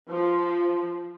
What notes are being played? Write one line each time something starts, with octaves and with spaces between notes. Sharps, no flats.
F3